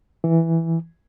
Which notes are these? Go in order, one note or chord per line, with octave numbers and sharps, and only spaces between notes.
E3